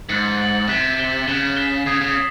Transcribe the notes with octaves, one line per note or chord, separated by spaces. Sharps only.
G#2 F#6 A6 C#7 F#7
F#6 A6 C#7 F#7
C3 F#6 B6 E7 G7
F#6 B6 E7 G7
C#3 F#6 B6 E7 G7
F#6 B6 E7 G7
C#3 D#6 G#6 C7
C#3